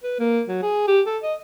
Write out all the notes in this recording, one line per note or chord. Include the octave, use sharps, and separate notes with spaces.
B4
A#3
F#3
G#4
G4
A4
D#5